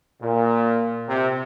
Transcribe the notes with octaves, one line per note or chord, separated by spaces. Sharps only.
A#2
C3